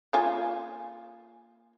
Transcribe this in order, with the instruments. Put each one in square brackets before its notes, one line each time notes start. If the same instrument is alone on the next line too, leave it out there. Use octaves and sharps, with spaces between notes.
[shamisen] A#3 F4 G#5